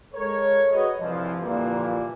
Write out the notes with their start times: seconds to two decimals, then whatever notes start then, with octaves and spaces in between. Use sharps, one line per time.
0.14 G#3 A4 A#4 C#5
0.71 F#4 G#4 B4 C#5 D#5
1.00 C2 G2 E3 F3
1.41 A#2 D3 E3 F3 G3 A#3